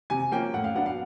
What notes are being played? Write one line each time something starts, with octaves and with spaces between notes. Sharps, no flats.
C3 G#5
F3 A#3 C#4 G5
A2 F#5
F5
F#3 B3 D4 F#5
F5